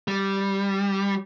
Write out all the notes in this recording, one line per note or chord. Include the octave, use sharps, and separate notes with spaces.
G3